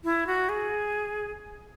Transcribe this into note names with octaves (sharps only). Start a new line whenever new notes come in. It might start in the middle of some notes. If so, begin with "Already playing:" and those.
E4
F#4
G#4